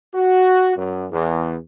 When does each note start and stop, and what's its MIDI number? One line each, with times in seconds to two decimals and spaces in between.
0.13 0.75 66
0.76 1.06 42
1.11 1.55 40